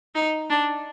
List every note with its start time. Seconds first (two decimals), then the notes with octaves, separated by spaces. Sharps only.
0.15 D#4
0.50 D4